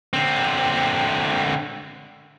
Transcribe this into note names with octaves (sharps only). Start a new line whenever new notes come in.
D3 C4